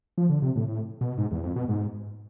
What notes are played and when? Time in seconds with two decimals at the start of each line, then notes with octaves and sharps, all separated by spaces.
0.18 F3
0.30 D3
0.42 C3
0.56 A2
0.68 A2
1.01 B2
1.18 G#2
1.31 E2
1.43 F2
1.56 B2
1.69 G#2